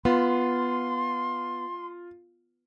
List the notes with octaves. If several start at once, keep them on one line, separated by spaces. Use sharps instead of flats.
B3 F4 C6